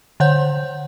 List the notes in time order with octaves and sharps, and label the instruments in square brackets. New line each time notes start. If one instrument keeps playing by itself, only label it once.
[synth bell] D3 C5 C#5 F#5 G6